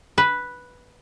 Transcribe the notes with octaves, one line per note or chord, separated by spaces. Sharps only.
B4